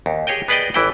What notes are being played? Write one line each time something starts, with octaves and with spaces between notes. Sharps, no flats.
D#2
G4 G#4 C#5 D#5 G5
B3 G#4 B4 D5 D#5 G5
A1 E3 E4 G5